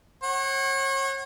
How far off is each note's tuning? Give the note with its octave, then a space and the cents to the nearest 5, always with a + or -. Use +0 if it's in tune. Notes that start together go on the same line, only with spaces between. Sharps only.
C#5 -35 F#5 +25